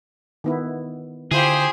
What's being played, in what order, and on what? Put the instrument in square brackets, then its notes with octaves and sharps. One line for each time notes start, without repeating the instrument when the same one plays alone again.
[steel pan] D#3 B3 E4
[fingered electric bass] D3 [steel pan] E4 F4 [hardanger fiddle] G4 C5 [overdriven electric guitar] G#4